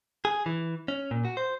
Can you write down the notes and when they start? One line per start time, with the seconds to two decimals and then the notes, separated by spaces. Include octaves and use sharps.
0.25 G#4
0.46 E3
0.88 C#4
1.11 A#2
1.25 F#4
1.37 C5